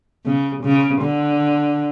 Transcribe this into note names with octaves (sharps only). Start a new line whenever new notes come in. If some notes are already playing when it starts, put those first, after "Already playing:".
C#3
C#3
D3